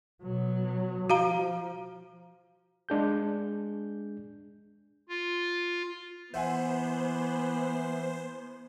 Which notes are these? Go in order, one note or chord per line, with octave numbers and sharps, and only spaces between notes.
B2 F#3
F3 F#4 F5 A#5
G#3 D4 G#4 G6
F4
E3 B3 C5 E5 F#5 G#5